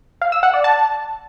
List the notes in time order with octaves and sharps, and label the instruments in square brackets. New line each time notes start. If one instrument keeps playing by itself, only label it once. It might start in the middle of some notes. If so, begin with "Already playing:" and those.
[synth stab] F5
E6
F#5
D5
A5